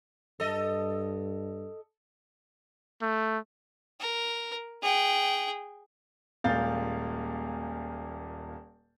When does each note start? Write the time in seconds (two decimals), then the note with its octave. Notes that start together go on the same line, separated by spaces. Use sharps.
0.40 G2 A4 D#5
3.02 A3
4.00 A#4
4.82 G#4 G5
6.44 D#1 A#2 G#3 F5 G6 A6